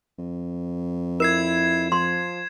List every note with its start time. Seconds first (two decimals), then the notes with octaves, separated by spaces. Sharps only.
0.18 F2
1.20 E4 A#4 G#6 C7 E7
1.92 F3 C6